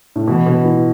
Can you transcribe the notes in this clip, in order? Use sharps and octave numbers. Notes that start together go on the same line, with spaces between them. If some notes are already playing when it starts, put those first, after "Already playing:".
A2
B2 E3
B2
E3